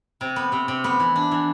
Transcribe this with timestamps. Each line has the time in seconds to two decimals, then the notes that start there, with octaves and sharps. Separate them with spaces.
0.21 C3
0.36 B3
0.52 C3
0.68 C3
0.84 B3
1.00 E3
1.16 D4
1.31 E3